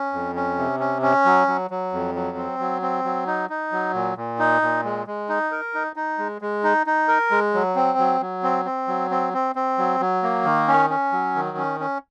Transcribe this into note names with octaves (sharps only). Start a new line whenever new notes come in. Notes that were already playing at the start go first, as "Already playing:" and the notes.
Already playing: C#4
F2
C#4
C3
C#4
C#4
F#3
F#3
F#3
F2
F#3
C4
F#3
C4
F#3
D#4
D#4
F#3
A#2
A#2
D#4
A#2
G#3
G#3
D#4
A#4
D#4
D#4
G#3
G#3
D#4
D#4
A#4
G#3
F#3
C4
F#3
F#3
C4
C4
F#3
C4
C4
C4
F#3
F#3
A#3
D#3
C#4
C#4
F#3
D#3
C#4
C#4